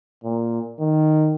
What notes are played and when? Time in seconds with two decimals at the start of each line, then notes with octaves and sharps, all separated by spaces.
0.24 A#2
0.79 D#3